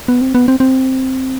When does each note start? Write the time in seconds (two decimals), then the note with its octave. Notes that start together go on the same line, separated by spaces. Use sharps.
0.08 B3
0.21 C4
0.35 B3
0.48 C4
0.60 C4